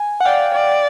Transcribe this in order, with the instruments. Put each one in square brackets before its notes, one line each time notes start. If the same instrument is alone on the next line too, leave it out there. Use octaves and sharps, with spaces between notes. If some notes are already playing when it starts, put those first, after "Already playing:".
Already playing: [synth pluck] G#5
F#5
[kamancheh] D5 [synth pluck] F5 G5
[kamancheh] D5